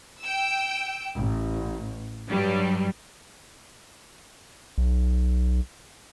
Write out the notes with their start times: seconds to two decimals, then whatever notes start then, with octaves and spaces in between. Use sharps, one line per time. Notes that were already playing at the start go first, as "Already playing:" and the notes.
0.21 G5 E6
1.16 A1
2.29 G2 F#3 G3
4.78 B1